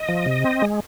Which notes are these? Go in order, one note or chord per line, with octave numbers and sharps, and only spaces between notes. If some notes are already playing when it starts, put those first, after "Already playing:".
Already playing: D#5
F3
C3
C4
G#3